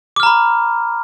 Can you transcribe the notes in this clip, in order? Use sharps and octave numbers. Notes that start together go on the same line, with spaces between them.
A#5 B5 D6 F6